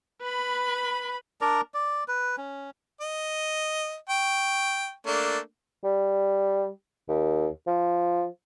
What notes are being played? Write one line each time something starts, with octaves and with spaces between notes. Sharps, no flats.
B4 B5
D4 A#4 D5 A#5
D5
B4
C#4
D#5
G5 C#6
A3 A#3 D4
G3
D#2
F3